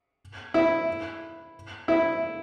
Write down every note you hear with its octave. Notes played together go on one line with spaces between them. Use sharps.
E4
E4